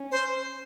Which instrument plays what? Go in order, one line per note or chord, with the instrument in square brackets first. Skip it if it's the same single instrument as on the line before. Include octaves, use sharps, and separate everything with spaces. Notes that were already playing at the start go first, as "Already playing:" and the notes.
Already playing: [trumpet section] C#4
[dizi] C5